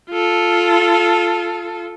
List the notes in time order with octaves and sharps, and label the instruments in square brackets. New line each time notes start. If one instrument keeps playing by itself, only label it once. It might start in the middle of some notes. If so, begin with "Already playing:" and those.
[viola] F4 A4